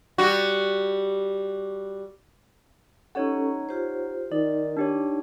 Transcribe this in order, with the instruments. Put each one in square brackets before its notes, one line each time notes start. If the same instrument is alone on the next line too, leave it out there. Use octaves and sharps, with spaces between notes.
[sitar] G3 F#4
[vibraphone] C#4 G4 A4 [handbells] D#4 C#5 F#5
[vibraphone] F4 G4 C5
[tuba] D#3 [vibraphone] D#4 [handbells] D5
[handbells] D4 G4 C#5